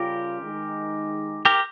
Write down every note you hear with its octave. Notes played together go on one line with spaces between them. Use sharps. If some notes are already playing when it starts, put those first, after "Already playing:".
Already playing: C#3 G3 C#4 F4 G4 A#4
D#3 G#3 D#4
G4 A#4